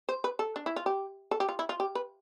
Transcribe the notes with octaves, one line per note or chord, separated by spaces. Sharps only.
C5
B4
A4
D4
E4
F4
G4
A4
G4
F4
E4
F4
G4
B4